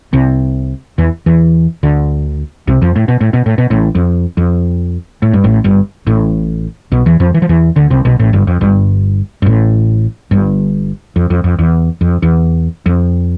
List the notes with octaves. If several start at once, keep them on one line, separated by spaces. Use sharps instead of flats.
C2 C3
E2 E3
E2 E3
D2 D3
C2 C3
F2 F3
A2
B2
A2
B2
A2
B2
A1 A2
F2
F2
A2
G2
A1 A2
G1 G2
A1 A2
B1 B2
E2 E3
F2 F3
E3
F3
E2 E3
D2 D3
C2 C3
B1 B2
A1 A2
G1 G2
F2
G1 G2
G2
A1 A2
G1 G2
F2
F2
F2
E2
F2
E2
F2